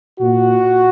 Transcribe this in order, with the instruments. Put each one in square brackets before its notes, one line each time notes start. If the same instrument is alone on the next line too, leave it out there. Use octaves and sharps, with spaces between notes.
[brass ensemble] A#2 F#4